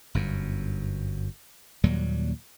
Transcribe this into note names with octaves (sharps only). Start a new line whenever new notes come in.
G1 F#2
D#2 A#2 F#3 G3